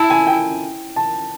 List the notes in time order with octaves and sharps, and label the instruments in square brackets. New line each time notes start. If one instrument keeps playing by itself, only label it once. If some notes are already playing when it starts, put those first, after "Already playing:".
Already playing: [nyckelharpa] E4 [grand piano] A5
[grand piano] G#5
G5
A5